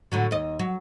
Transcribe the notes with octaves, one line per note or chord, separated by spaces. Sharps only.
A2 D3 F#3
D#2 D#5
F#3